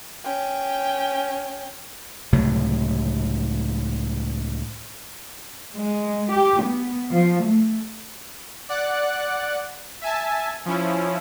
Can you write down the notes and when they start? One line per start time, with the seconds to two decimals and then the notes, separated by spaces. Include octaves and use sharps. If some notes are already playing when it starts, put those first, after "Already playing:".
0.25 C#4 G5
2.33 C#2 A2 C3 F#3
5.75 G#3
6.31 G4
6.62 B3
7.11 F3
7.44 A3
8.69 D5 F#5 F#6
10.02 E5 G#5 A5
10.66 F3 C#4 E4